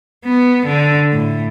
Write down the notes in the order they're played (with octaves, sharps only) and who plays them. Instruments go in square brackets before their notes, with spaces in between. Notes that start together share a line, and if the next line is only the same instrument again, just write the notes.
[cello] B3
D3
A2